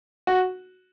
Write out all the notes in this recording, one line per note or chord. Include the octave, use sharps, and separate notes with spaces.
F#4